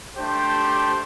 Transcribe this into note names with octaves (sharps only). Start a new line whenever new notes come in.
A3 D4 G4 C5